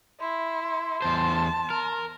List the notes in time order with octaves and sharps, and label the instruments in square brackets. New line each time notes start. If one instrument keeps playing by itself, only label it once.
[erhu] E4 [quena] C6
[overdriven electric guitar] E2 C5 [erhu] A5
[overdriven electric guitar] A#4